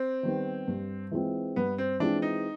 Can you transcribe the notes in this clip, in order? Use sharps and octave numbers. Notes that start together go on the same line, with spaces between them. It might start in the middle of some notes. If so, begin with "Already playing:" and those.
Already playing: C4
D#3 G3 B3
G2
E3 G#3 C4 F4
G2 B3
C4
E3 G#3 C4 D4 F4
D#4